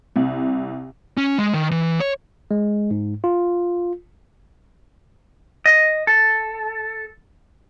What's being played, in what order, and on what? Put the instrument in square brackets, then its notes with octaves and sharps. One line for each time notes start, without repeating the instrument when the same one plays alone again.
[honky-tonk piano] C2
[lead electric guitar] C#4
G#3
D#3
E3
C#5
[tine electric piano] G#3
G#2
F4
[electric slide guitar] D#5
A4